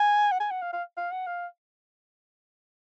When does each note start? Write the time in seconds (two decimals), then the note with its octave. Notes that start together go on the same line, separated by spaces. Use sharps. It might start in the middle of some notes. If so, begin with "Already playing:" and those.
Already playing: G#5
0.32 F#5
0.40 G#5
0.51 F#5
0.62 F5
0.73 F5
0.98 F5
1.12 F#5
1.27 F5